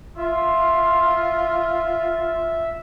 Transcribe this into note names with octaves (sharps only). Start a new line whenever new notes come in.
F4 E5 C6